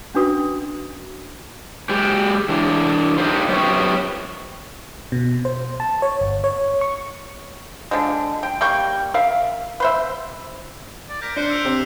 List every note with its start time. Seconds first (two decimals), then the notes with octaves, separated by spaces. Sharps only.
0.14 C#4 D4 F#4 B4 D#6
1.89 G#3 G4
2.48 E3 D4
3.18 D4 D#4 F4 G4 C5
3.48 F#2 F3 B3 G4 C#5
5.12 B2
5.45 C5
5.80 A5
6.02 C#5
6.21 G1
6.44 C#5
6.81 C#6
7.91 D3 F3 G#3
8.43 G5
8.61 G3 A#3 G5 C#6
9.14 A#4 E5 F5
9.80 B4 C5 E5
11.09 D5
11.22 A#4 G6 B6 D7
11.36 D4 C5 F#6 C#7 G7
11.50 E6 D7 F7
11.65 C3